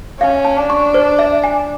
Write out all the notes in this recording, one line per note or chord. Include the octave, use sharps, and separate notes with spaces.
C#4 F5
A5
D4
C#6
C5
E5
G#5